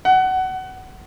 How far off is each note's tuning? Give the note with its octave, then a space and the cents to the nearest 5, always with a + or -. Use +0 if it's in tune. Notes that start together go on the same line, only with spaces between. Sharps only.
F#5 +20